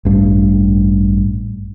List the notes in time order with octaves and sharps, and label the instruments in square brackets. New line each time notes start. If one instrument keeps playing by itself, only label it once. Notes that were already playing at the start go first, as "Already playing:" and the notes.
[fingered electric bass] A1 G2